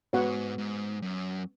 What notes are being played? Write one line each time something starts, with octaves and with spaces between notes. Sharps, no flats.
G#2 B3 F#4 C#5 F#5
G#2
F#2